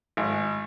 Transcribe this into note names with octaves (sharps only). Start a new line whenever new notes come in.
G#1